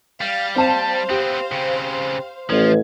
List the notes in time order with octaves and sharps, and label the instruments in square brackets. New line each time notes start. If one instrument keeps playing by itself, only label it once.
[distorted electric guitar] G3 [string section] F5
[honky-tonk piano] C4 A5 E7 [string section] C5 F5
[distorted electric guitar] B3 C4 [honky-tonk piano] G4
[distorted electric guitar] C#3 C4
[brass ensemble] A1 [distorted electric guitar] F3 [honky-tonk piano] G#6